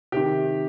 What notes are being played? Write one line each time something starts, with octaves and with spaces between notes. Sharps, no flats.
C3 D#3 G4